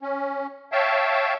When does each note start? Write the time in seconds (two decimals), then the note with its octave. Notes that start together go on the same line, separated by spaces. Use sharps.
0.01 C#4
0.72 C#5 E5 F5 G5 A5